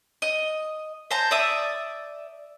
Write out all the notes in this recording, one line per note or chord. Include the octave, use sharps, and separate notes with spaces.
D#5
C5 A5 A#5
D5 E5 D#6